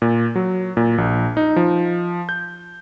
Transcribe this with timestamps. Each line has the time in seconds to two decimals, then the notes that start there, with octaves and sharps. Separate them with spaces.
0.02 A#2
0.36 F#3
0.77 A#2
0.98 A#1
1.37 D#4
1.56 F3
2.29 G6